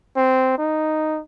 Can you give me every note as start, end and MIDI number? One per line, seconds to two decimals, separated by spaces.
0.17 0.58 60
0.58 1.20 63